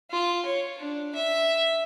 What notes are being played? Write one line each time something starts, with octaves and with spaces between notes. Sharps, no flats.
F4
C#5
D4
E5